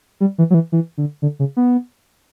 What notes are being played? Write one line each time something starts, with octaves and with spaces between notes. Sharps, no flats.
G3
E3
F#3
E3
E3
D3
D3
C#3
B3